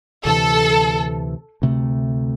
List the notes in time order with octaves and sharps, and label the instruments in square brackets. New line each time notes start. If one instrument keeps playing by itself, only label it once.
[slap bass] D2 C3 E3 [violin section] A4
[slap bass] D2 C3 A3